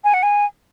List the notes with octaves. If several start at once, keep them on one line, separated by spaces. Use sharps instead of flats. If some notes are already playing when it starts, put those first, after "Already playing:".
G#5
F#5
G#5